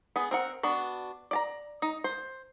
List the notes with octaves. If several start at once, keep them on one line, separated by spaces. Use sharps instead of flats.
B3 G#4
C4 A#4 F#5
B3 D4 F#4
D5 A5 A#5
D#4
C5